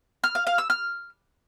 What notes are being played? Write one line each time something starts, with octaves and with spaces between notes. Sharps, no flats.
F6
F5
F5
E6
F6